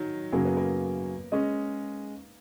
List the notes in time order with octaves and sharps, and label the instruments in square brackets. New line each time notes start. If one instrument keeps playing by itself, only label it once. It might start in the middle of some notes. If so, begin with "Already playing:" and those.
Already playing: [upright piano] D#3 F#3
[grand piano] F#2 C#3 F#3 C#4 G#4 [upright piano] A#3
[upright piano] B3
A#3
[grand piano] G#3 C#4 G#4 D#5